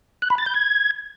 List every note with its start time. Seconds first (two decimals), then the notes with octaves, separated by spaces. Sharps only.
0.22 F#6
0.30 B5
0.38 A6
0.46 G6
0.54 G#6